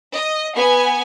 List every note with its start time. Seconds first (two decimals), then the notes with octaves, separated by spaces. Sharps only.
0.14 D#5
0.57 B3 G#5